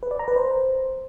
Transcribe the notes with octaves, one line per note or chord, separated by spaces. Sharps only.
B4
D5
A#5
B4
C5